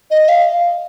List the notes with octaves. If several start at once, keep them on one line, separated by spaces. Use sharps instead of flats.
D#5
F5